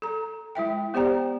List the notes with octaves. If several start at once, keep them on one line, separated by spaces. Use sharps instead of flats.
A4 A#5
G#3 E4 E5 G5
B3 G4 C5 D5 G5 A#5